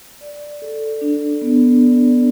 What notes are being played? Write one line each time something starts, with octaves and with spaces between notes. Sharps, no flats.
D5
A4
D4
B3
D5